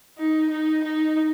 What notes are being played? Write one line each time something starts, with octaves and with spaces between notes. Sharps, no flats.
D#4
D#4
D#4